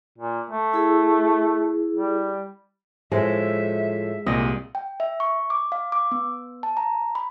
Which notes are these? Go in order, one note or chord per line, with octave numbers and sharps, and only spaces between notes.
A#2
A3
E4 G#4
G3
A2 F3 G#3 E5
C2 A#2 D#5
G5
E5
C#6
D6
F5
D6
B3
A5
A#5
B5